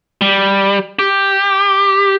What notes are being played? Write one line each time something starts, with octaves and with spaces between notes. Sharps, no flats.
G3
G4